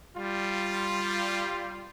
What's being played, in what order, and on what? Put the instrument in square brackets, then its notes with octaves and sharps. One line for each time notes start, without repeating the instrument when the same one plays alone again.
[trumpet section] G3 F4